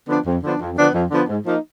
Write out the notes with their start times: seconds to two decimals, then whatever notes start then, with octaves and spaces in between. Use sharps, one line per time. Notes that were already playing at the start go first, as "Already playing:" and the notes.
0.08 D3 F3 B3 D4
0.26 F2
0.43 D3 F3 B3 D4
0.60 F2
0.77 D3 F3 B3 D4
0.95 F2
1.11 D3 F3 B3 D4
1.29 G#2
1.46 F3 A#3 D#4